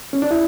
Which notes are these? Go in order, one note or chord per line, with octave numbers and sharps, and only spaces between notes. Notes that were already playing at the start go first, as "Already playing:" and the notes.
C#4
D4
E4